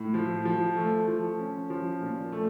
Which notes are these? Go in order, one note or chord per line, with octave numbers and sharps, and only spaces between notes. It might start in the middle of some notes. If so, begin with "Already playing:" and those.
Already playing: A2
F3
F3
A3
F3
C#4
F3
A#2
A3